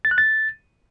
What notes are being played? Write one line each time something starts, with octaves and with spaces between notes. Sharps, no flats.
A6
F#6
A6